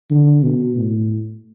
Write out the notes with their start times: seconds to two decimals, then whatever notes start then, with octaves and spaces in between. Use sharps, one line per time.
0.11 D3
0.43 B2
0.76 A2